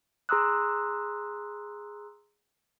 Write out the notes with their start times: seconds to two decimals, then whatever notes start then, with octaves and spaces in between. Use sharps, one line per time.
0.29 G#4 A#5 C6 D#6 E6 F#6